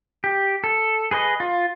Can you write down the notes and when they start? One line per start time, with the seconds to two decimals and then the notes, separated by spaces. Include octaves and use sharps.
0.24 G4
0.64 A4
1.11 G#4 B4 C5 D#5
1.40 F4